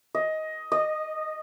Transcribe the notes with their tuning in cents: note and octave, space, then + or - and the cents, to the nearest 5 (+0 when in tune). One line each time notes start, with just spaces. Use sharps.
D#5 +15
D#5 -15